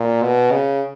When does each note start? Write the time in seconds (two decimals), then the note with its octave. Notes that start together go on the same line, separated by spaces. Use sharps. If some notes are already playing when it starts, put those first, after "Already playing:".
Already playing: A#2
0.23 B2
0.52 C#3